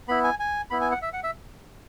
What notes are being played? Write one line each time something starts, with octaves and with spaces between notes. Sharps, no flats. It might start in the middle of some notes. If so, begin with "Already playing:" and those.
B3 E4 B5
G#5
G#5
B3 E4 B5
G#5
F#5
E5
F#5
E5